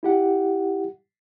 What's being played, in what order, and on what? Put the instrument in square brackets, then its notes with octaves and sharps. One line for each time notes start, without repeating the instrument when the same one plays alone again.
[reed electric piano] E4 G4 F#5